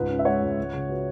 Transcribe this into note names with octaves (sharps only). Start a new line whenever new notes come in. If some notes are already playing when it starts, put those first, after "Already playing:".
Already playing: C#2 G#2 B4
C#4
E5
G#3 C#5 F#5
C#2
C#2
C#3
F#4 B4